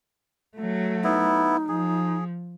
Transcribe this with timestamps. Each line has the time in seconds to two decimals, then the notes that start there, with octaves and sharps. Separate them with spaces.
0.56 F#3 A3
1.04 B3 D#4 E4
1.68 F3 G#4